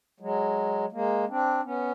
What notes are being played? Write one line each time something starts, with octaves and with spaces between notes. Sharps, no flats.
F#3 G#3
G#3 A#3
C4 D4
B3 C#4